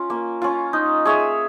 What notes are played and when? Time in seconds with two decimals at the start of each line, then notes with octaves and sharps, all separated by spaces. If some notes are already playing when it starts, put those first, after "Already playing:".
Already playing: C#4 F4
0.10 A#3
0.42 C#4 F4
0.73 D#4
1.05 G#4 C#5 E5